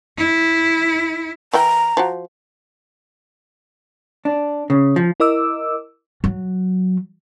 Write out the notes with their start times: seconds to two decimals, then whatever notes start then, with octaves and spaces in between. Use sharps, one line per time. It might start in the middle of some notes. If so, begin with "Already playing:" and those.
0.18 E4
1.53 E3 E4 G5 A#5
1.97 F3 F#4
4.25 D4
4.70 C#3
4.96 F3
5.20 E4 A#4 D#5 D6 E6
6.24 F#3